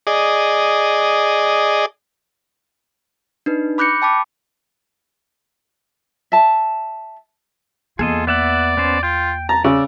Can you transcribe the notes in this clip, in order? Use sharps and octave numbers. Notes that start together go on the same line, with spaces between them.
G#4 D5 D#5
D4 D#4 B4
B5 D6 F#6 G6 A#6 C#7
G5 A5 B5 D6
E5 A5
E2 A#3 F4 G#4 A4 D#5
B3 D5 E5 F#5
B3 C#4 C5
F4 G5
A5 A#5
C#3 D5 E6